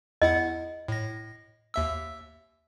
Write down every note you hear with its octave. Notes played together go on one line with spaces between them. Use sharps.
E2 E4 D#5 F#5
A2 A#6
D#2 E5 E6